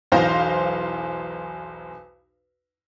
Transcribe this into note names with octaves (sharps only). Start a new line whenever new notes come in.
B1 E2 C5 F5 A#6